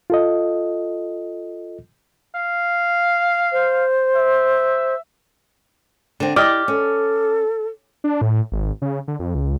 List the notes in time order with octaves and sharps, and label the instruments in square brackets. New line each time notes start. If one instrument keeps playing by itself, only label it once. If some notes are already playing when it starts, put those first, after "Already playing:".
[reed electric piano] F4 A4 D#5
[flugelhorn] F5
[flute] C5
[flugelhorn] E5
[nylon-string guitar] D3 C4
[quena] E4 [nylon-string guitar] G4 [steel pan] D5 D#5 [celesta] D6 F6
[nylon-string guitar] C#4 [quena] A4
[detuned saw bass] D4
A2
G#1
C#3
D3
F2
C#2